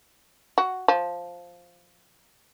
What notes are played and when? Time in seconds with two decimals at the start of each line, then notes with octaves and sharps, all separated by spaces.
0.58 F#4
0.88 F3